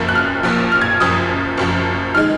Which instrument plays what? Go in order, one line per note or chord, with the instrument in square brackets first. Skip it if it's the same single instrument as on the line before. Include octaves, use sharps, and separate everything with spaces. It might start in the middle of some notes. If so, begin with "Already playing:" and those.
Already playing: [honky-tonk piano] F#1 F#2 F3 A#3
F#6
F6
A#1 A#2 F3
F6
G#6
F#1 F#2 F3 D#6
F#1 F#2 F3
D#3 G#3 F6